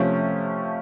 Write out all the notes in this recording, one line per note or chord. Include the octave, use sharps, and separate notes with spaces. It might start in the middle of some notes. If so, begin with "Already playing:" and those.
Already playing: C3 F3 A3 C#4